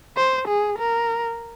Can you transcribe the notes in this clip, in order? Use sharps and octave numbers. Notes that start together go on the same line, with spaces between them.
C5
G#4
A#4